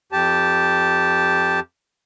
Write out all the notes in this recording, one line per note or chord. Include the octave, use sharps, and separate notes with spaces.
F2 G4 A5